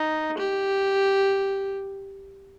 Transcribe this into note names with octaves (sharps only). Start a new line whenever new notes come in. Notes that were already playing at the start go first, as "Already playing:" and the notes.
Already playing: D#4
G4